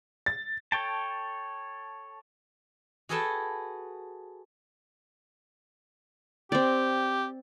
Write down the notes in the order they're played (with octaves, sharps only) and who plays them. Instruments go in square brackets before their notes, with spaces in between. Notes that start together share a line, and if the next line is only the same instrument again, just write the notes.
[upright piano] A6
[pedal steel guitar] A4 C#5 G5 A5
[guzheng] F#4 G#4 A4 B4 G5 A5
[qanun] C4 D5 [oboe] G4